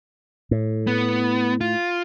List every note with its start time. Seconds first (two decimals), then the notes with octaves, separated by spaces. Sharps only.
0.51 A2
0.87 B3
1.61 F4